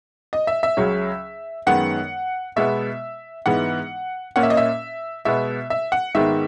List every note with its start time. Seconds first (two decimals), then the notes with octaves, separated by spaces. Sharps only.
0.33 D#5
0.47 E5
0.63 E5
0.77 C#2 C#3 F#3 C#4
1.67 F#2 D#3 G#3 B3 F#5
2.56 B2 G#3 B3 E5
3.46 G#2 E3 G#3 B3 F#5
4.36 A#2 A#3 C#4 F#5
4.43 E5
4.50 D#5
4.57 E5
5.25 B2 G#3 B3 E5
5.70 E5
5.92 F#5
6.15 G#2 D#3 G#3 B3 E5